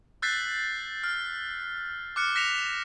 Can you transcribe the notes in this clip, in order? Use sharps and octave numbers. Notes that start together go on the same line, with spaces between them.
E6 F#6 G6 A6 B6 C7
F6
D6 F6 F#6 C#7
F#6 A#6 B6 C#7 E7 F7